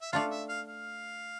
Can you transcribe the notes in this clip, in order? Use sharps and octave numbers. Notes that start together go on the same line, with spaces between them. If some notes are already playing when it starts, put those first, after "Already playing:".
E5
A3 D4 F4 F5
E5
F5
F5